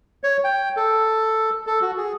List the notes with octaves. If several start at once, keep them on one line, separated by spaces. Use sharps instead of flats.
C#5
G5
A4
A4
F#4
G#4